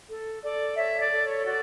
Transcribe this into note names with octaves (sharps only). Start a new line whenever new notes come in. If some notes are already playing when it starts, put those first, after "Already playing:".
A4
A4 D5
C#5 E5
D5
A4
C#5
F#4 D5